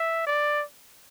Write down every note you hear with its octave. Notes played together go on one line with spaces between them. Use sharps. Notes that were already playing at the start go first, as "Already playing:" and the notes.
Already playing: E5
D5